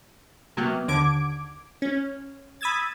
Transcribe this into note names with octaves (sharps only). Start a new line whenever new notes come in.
C3 F#3 A#3 B3
D#2 D3 D6 G#6 D7
C#4
B5 D#6 E6 G#6 A6